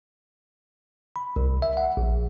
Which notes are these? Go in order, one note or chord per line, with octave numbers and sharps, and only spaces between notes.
B5
C2
E5
F#5
A#1